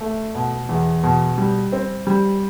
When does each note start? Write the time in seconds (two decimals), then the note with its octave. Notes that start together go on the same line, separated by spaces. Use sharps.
0.01 A3
0.35 B2
0.69 E2
1.03 B2
1.38 G3
1.72 C4
2.07 G3